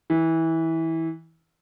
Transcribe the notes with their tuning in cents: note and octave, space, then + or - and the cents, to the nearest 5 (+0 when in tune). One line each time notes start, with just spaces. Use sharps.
E3 -20